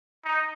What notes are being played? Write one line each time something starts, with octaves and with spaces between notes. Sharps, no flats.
D#4